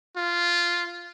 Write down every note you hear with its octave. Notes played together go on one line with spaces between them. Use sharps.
F4